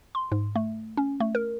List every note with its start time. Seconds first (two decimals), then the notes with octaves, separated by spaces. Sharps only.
0.15 C6
0.32 G#2
0.56 A3
0.97 C#4
1.20 A3
1.35 A#4